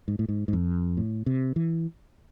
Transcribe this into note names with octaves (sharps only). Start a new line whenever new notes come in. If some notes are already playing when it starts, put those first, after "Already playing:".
G#2
A2
G#2
G#2
F2
A2
C3
E3